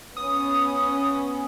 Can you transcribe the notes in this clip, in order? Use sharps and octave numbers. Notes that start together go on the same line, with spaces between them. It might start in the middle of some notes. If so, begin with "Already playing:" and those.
B3 C#4 D#6